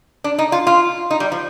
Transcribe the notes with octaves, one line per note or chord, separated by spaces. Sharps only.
D4
D#4
F4
F4
D#4
G3
F3